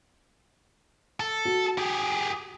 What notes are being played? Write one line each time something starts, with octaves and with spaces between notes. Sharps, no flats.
A4
F#4
G4 G#4